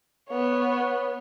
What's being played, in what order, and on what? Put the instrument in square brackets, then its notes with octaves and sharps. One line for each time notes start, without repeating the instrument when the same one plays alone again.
[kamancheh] B3 C#5